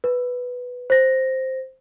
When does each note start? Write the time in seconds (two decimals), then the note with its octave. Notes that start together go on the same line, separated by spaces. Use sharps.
0.04 B4
0.90 C5 A#6